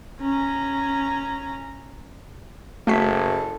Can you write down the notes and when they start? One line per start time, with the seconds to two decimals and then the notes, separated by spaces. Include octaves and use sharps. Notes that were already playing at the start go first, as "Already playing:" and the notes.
0.20 C#4 A#5
2.87 F#1 A3 F#4 A4 B6